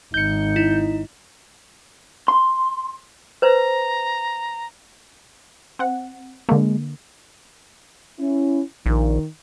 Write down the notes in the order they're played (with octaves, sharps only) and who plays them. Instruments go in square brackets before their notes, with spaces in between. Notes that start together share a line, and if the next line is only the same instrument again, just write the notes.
[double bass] G#1 [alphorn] D#4 [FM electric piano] G6 C#7
[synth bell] E4
[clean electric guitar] C6
[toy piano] B4 C5 [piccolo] A#5
[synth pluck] C4 F#5
[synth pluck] D3 A#3 [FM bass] G#3
[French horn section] C#4 E4
[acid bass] A#1 [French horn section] D#3